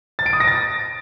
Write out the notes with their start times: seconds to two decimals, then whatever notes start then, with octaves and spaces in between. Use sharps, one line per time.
0.19 A6
0.26 D7
0.33 D#6
0.40 A#6
0.48 A6